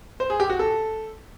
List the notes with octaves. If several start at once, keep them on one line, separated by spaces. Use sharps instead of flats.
C5
G#4
G4
F#4
A4